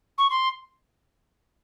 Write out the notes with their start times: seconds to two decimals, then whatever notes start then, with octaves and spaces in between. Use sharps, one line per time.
0.18 C#6
0.30 C6